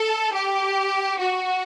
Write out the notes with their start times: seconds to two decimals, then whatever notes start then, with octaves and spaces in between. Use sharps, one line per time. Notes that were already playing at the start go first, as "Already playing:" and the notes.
Already playing: A4
0.34 G4
1.19 F#4